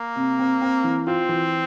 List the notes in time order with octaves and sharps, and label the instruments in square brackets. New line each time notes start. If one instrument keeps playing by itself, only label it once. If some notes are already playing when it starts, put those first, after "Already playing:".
Already playing: [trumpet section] A#3
[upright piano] C3
C4
C4
E3
[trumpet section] C4 [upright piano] F4
[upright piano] E3